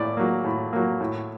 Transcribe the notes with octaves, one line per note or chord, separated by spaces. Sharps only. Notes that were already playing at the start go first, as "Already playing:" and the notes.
Already playing: A2 A#3 D5
F#3 A#3
A2
F#3 A#3
A2